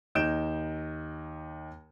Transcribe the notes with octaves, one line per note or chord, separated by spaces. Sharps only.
D#2 D#4 G6 D7 E7